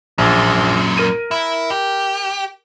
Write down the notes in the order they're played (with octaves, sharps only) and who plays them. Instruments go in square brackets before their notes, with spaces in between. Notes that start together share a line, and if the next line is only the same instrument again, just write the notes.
[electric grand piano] A#1 [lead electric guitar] F#2 A#2
[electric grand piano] A#4 D#7
[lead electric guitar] E4
G4